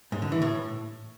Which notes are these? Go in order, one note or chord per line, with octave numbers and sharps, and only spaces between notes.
G#2
D3
E3
A2